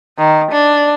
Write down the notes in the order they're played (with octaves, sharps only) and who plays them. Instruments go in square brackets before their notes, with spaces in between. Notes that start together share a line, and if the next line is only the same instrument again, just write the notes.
[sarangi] D#3
D4